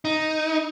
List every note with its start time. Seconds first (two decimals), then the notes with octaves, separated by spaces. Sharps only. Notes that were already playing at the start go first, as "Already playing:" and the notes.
0.05 D#4